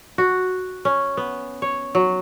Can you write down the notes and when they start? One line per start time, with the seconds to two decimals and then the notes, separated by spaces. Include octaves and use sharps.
0.18 F#4
0.85 C#4
1.17 B3
1.62 C#5
1.95 F#3